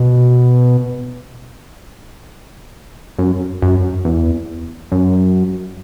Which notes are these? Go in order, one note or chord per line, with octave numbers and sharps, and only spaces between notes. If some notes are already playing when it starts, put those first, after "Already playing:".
Already playing: B2
F#2
F#2
E2
F#2